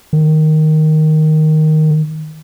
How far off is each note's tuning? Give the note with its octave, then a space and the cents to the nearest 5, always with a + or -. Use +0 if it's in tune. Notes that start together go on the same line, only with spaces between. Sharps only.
D#3 +0